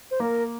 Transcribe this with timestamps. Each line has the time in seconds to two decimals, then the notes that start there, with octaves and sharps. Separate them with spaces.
0.11 C5
0.20 A#3 A#4